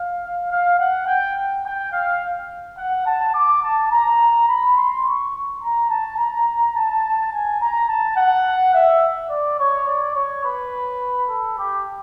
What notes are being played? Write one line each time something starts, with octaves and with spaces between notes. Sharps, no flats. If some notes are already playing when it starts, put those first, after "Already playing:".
Already playing: F5
F5
F#5
G5
G5
F5
F#5
A5
D6
A5
A#5
B5
C6
C#6
A#5
A5
A#5
A5
G#5
A#5
A5
F#5
E5
D5
C#5
D5
C#5
B4
A4
G4